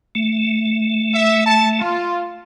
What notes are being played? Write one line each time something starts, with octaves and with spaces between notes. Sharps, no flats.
A3
E5
A5
F4